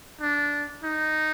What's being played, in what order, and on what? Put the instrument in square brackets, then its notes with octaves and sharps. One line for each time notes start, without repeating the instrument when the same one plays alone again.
[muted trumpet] D4
D#4